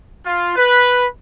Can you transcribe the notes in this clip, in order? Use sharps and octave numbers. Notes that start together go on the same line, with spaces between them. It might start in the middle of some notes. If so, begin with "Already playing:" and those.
F4
B4